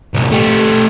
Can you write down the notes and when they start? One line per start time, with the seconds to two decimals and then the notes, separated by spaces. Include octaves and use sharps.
0.14 C2 A#2
0.32 A3 G4